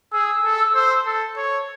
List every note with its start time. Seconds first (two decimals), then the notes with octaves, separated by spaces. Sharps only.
0.12 G#4 E6
0.44 A4
0.75 C5
1.06 A4
1.37 C#5